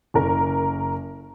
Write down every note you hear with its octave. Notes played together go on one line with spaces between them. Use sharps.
F#1 A#4